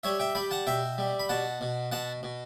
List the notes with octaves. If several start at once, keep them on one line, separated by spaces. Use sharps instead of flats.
G3 C#5 E5
E5 G5
G3 G5 B5
F#5 A5
B2 E5 G5
G3
B5
B2 F#5 A5
B2
B2 F#5 A5
B2